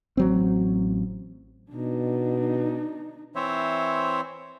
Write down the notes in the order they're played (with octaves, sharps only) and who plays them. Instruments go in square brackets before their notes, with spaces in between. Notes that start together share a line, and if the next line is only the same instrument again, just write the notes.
[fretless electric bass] A1 F#3 C4
[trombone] B2 [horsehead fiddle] D4 D#4
[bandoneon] E3 C4 C5 C#5 E5